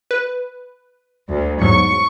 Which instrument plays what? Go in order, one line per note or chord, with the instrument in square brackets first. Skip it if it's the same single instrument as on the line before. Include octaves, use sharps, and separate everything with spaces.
[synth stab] B4
[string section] D2
[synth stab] E2 G#2 F#3 [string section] C#6